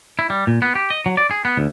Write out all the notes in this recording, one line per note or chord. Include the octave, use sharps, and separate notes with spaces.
E4
G3
A#2
B3
G4
D#5
F#3
D5
G#4
B3
D2